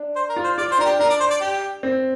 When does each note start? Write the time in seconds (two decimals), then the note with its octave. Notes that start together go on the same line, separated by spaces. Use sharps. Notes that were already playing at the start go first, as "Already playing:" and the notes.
Already playing: D4
0.16 C5
0.29 A#4
0.36 F4
0.44 C5
0.58 F4 D5
0.71 C5
0.78 D4 A#4
0.85 G4
0.99 D4 A#4
1.10 D5
1.20 C5
1.30 D5
1.41 G4
1.83 C4